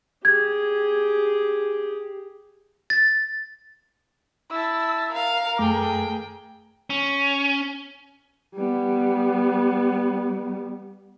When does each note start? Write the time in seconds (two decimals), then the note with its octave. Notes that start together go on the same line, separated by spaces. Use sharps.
0.25 G4 G#4 G#6
2.90 A6
4.50 E4 A5 E6
5.13 A#4 F5
5.58 F#2 A3 G#4 G5 D6
6.90 C#4
8.55 G3 B3